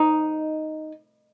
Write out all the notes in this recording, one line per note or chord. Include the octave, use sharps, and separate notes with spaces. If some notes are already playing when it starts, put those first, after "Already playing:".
Already playing: D#4